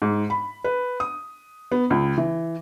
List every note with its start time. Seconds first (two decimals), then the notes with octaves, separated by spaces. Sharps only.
0.02 G#2
0.30 B5
0.64 B4
1.00 D#6
1.72 B3
1.90 C#2
2.18 E3